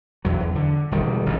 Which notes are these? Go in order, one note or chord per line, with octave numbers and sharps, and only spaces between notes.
E2 F#3
E2
D3
E1 D#3 G3
A1 G#2